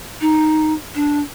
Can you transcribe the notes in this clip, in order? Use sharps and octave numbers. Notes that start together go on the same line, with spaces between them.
D#4
D4